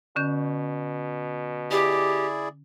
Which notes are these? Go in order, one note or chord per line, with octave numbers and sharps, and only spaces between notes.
B2 D3 C#4 G6
E4 G4 G#4 D5